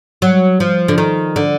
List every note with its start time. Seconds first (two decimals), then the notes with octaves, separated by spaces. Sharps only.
0.22 F#3
0.60 F3
0.88 D3
0.98 D#3
1.36 D3